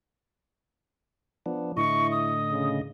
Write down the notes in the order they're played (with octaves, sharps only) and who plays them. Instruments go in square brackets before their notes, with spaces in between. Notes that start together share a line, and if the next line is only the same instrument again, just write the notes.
[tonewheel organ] F3 B3 D4
[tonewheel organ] A2 D3 D#5 [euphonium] E4 [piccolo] C#6
[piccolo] D#6
[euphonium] C#3